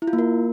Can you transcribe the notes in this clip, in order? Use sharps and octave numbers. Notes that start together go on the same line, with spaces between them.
E4
F4
A#3
A#4